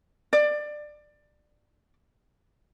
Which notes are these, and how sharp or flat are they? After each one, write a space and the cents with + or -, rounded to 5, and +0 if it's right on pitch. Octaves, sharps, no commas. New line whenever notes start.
D5 +20